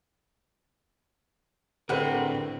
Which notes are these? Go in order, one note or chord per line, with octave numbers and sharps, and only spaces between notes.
A2 D3 C4 G4 G#4 A#4 B4 F#5